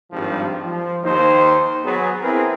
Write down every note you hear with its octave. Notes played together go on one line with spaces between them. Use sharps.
G#1 G2 D#3 F3 G3 F4
F3
D#2 D#4 C5
F#3 B3 G#4
C4 E4 G#4 A#4 B4